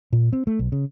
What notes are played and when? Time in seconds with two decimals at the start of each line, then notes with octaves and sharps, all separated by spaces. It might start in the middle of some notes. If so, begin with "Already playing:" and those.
0.13 A#2
0.33 C4
0.47 A3
0.59 B1
0.72 C#3